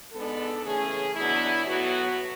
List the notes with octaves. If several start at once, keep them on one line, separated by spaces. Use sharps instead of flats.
G#2 G#3 B3 D4 A4
C#3 E3 A3 C#4 G#4
E2 B2 F#3 B3 D4 E4
A2 F#3 B3 F#4